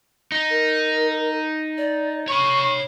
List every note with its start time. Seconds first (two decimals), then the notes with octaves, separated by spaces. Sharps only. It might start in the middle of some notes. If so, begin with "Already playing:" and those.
0.32 D#4
0.50 A#4
1.78 D5
2.28 C#5 B5 C#6